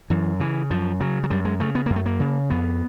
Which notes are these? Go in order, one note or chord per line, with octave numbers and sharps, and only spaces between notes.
F#2 E3
C#3 E3
F#2 F3
C#3 F#3
F#3
F#2 G3
G#3
C#3 A3
B3
F#2 A#3
A3
A#3
C#3
F2 B3